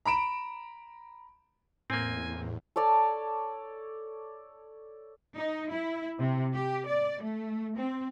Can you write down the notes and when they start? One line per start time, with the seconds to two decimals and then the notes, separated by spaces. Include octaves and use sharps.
0.05 A#5 B5 D7 E7
1.90 E2 A2 A#3 C4 G#5
2.76 A4 C#5 D5 A5
5.36 D#4
5.71 E4
6.19 C3
6.54 G4
6.87 D5
7.22 A3
7.77 C4